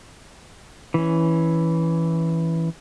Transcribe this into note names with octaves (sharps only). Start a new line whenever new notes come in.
E3 C#4